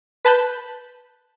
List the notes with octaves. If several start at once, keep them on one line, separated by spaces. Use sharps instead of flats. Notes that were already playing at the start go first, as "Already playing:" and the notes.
B4 A5 B5 G6